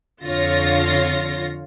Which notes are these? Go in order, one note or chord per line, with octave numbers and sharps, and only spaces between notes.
F2 D3 F4 C#5 A#6